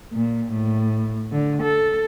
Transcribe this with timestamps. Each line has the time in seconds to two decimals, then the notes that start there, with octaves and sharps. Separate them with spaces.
0.13 A#2
0.52 A2
1.32 D3
1.63 A4